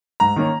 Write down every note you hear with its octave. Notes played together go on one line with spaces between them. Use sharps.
G#2 A#5
D#3 A#3 C#4